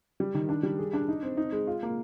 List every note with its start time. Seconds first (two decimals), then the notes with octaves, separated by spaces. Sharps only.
0.20 G3
0.35 D#3
0.49 D4
0.63 G3
0.79 G#4
0.93 D4
1.08 D#4
1.23 C4
1.37 D#4
1.52 G#3
1.67 F4
1.83 A#3